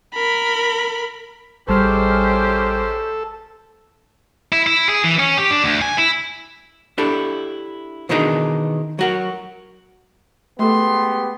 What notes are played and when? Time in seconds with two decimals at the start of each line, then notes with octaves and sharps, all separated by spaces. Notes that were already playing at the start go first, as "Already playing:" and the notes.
0.14 A#4 B5
1.69 A1 G3 G#3 C#4 G4 A4 C5 F6
4.52 E4
4.67 E4
4.89 G#4
5.04 E3
5.19 C#4
5.37 G4
5.50 D4
5.64 D2
5.82 G#5
5.98 E4
6.98 D4 E4 G4 A4
8.09 B2 D#3 E3 D4 D#4 G#4
8.99 F#3 F#4 A#4
10.59 G#3 A3 B3 G4 A4 C6